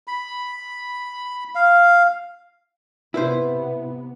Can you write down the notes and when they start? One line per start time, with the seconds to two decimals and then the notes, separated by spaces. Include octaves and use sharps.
0.07 B5
1.55 F5
3.14 C3 B3 E4 B4 C5